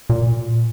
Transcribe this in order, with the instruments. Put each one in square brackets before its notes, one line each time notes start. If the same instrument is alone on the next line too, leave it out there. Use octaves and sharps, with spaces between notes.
[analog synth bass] A#2